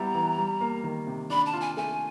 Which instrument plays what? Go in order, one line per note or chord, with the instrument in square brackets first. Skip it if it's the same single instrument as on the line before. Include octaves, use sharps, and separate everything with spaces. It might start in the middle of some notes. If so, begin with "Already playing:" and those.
Already playing: [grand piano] G3 B3 E4 [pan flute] A#5
[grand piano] E3
G3
A#3
D#3
C3
[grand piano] D4 [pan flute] B5
[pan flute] A5
[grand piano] F4
[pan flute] G#5
[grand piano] A3 [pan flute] G#5